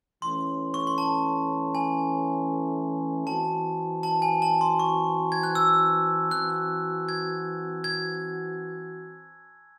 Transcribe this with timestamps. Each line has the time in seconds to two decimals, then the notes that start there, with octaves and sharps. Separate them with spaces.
0.22 E3 A3 C#4 C6
0.74 C#6
0.87 C6
0.98 A5
1.75 G#5
3.27 E3 C4 F#4 A5
4.03 A5
4.22 G#5
4.42 A5
4.61 C6
4.79 C#6
5.32 G#6
5.43 F#6
5.55 E6
6.31 E3 C4 F#4 F#6
7.09 G#6
7.84 G#6